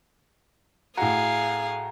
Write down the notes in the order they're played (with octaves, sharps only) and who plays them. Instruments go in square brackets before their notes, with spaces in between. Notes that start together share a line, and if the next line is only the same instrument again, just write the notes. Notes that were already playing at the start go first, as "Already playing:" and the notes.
[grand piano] A2 F#4 [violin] G#4 F5 [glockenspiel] A#5